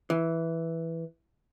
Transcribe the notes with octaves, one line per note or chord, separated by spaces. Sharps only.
E3